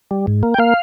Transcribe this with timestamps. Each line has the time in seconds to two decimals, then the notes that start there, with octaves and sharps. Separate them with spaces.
0.11 G3
0.27 G#2
0.43 A#3
0.54 G5
0.58 A#3 F5